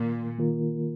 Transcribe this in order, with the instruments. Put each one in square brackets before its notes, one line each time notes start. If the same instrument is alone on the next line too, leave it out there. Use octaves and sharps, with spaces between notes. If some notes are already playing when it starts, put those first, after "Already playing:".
Already playing: [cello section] A#2 [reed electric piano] D#3 A#3 F4 A#4
[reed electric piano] D#3 A#3 F4 A#4